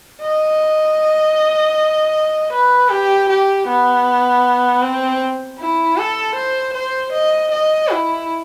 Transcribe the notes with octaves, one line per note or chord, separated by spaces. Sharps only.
D#5
B4
G4
G4
B3
C4
E4
A4
C5
C5
D#5
D#5
E4